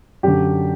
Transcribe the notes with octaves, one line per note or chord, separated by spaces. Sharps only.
F#2 D3 G4